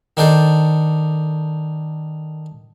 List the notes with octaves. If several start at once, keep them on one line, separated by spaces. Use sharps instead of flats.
D#3 D4 A4 C5